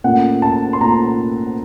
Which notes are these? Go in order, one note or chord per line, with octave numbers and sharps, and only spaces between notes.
A#2 A3 C#4 F4 F#5
A5
C6
A#2 A3 C#4 F4 A#5